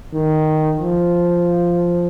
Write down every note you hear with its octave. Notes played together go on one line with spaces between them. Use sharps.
D#3
F3